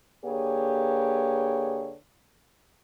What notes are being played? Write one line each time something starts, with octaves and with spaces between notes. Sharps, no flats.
D3 A#3 G4 G#4 B4 C#5